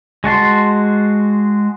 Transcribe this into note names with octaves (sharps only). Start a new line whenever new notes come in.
G#3 F#4 A5 C6